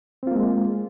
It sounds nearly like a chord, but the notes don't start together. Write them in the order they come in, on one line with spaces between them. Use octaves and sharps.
C4 F4 A#3 G#3